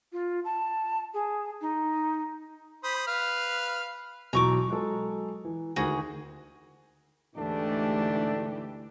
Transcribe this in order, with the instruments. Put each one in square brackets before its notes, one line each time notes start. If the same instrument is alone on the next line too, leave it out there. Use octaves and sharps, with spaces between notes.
[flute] F4
A5
G#4
D#4
[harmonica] C5 B5 D#6
B4 F5 F6
[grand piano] B1 E3 F#3 [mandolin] A#5 C#6 D6
[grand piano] F#3 G#3 A4
E3
[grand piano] D2 D#3 [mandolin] F#4 G#4
[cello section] D2 E3 G4 [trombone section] G#2 A3 D4